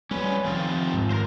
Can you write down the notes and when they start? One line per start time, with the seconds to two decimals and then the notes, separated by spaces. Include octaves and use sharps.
0.11 G3 C#4 B4
0.45 C3 D#3 F3 C4 F4
0.93 G#2
1.11 A#4 C5